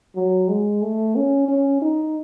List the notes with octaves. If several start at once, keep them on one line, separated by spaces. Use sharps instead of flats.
F#3
G#3
A3
C#4
C#4
D#4